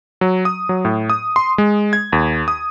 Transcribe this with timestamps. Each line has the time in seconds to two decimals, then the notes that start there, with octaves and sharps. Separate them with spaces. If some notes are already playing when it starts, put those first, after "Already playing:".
0.21 F#3
0.45 D#6
0.69 F#3
0.85 A2
1.10 D#6
1.36 C6
1.58 G#3
1.93 G#6
2.13 D#2
2.48 D#6